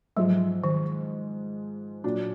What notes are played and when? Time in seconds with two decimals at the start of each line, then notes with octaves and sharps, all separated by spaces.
0.16 G#2 F3 F#3 G#3
0.64 D#3
2.04 A#2 F#3 D4